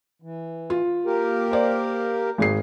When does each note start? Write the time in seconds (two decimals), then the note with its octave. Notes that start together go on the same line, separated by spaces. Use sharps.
0.22 E3
0.70 F4
1.06 A#3 G4 A#4
1.52 C5 D5
2.38 G#1 G#4 C7